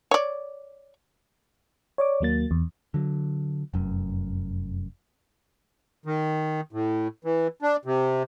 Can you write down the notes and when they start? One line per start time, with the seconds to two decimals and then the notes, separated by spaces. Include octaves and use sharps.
0.11 C#5 D5
1.98 C#5 D5 D6
2.21 D#2 F#3 A#3 A6
2.51 E2
2.94 D3 F#3
3.74 F1 F#2
6.06 D#3
6.73 A2
7.24 E3
7.62 D4
7.85 C3